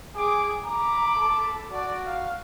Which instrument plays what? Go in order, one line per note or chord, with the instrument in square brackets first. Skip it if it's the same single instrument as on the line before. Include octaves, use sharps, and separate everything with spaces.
[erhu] G#4 [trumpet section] G5 D6
[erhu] A#5 [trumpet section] B5 D6
[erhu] A4
[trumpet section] F#4 [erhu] D5
[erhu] F5